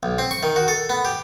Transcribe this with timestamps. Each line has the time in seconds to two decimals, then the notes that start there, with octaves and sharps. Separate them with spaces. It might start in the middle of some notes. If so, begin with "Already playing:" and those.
0.03 B1
0.19 C4
0.31 C#6
0.43 D#3
0.56 F#4
0.68 A4
0.89 B3
1.05 G4